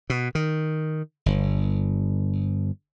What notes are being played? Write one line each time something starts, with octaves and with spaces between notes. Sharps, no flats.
B2
D#3
G1